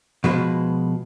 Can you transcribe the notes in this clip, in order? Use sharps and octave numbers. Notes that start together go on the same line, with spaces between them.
B2 F3 G#3 B4